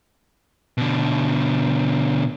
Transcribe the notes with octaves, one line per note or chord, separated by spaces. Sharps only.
B2 D3